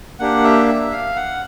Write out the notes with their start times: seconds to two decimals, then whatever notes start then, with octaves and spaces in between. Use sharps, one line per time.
0.19 A#3 D4 G4 F#5
0.44 E5
0.68 E5
0.92 F5
1.16 F#5